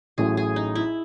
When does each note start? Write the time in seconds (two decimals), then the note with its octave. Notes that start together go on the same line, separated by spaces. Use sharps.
0.18 A1 A2 F#3 G#4
0.37 G#4
0.56 D#4
0.75 E4